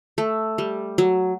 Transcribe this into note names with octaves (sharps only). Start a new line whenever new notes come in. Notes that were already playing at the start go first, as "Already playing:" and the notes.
A3
G3
F#3